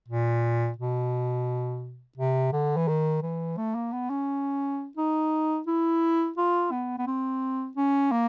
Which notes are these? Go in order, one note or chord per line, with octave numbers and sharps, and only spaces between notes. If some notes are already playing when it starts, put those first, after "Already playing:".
A#2
B2
C3
D3
E3
D#3
E3
A3
A#3
B3
C#4
D#4
E4
F4
B3
B3
C4
C#4
A#3